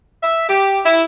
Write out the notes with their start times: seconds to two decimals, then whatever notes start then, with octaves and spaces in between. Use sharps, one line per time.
0.22 E5
0.47 G4
0.83 E4